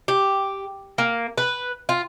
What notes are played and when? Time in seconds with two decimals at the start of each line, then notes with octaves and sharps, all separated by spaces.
0.08 G4
0.98 A#3
1.38 B4
1.89 F4